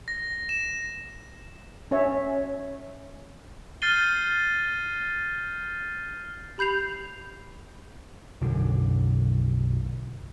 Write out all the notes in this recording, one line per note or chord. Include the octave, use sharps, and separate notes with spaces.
A#6
E7
C#4 C#5 E5
F6 G6 A6 C7 D#7 G7
G4 B5 G6 C7 F7
B1 F#2 D3